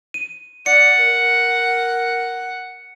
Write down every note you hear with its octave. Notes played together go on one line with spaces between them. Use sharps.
D#7
D5 F#5 C#7
A#4